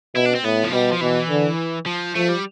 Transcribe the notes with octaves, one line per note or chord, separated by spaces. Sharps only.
B2 E4
D4
C4
A2 B3
F3
B2 G3
F3
B2 E3
D3
F3
F3 A3
G3